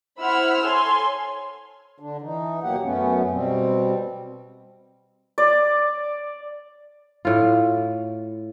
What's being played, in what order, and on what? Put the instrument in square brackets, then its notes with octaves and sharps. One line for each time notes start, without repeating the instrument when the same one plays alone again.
[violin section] E4 C5 F#5 B5 E6 F6
A4 C#5 G#5 C6
[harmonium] D3 D4
E3 D#4
D#2 B2 F#3 A#3 G4 F#5
F#2 A3 B3 C#4
B2 G3 C4
[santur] D5
[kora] A2 F4